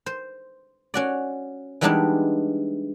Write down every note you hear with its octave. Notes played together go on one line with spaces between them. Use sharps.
C5
C#4 F#4 D5
E3 G3 G#3 B3 D4 D#4